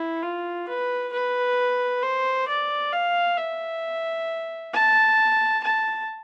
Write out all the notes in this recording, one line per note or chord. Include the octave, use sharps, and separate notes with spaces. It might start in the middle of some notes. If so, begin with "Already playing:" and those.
Already playing: E4
F4
B4
B4
C5
D5
F5
E5
A5
A5